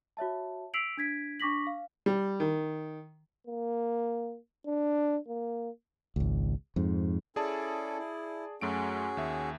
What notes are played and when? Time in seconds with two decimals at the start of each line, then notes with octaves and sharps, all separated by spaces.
0.17 F#4 C#5 E5 A5
0.74 E6 B6 C7 D7 F7 F#7
0.97 D4 G#6 B6 D7
1.40 D4 C#6 D6 A#6 B6 F#7
1.67 F5
2.06 G3
2.40 D#3
3.47 A#3
4.66 D4
5.28 A#3
6.16 G#1 C#2
6.76 F2 G#2
7.36 C#4 E4 G#4 A4 D5 A5
7.98 E4
8.61 F#2 A3 C#4 F#4 G#4 D7
9.17 D#2 E5